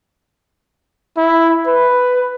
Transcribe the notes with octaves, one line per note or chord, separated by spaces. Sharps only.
E4
B4